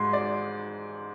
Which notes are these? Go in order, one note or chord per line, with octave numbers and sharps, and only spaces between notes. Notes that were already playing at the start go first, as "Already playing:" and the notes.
Already playing: G#2 G#3 C6
D5